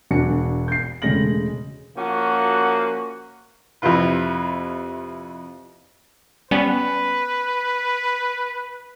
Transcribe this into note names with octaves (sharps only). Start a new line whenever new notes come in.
E1 D4 F#4 G#5 C#7
G6 C7
E1 C#3 G#3 A3 A#6 F#7
F3 A#3 C#4 F#4
F2 C3 E4 F4 B4
G3 B3 C#4 B4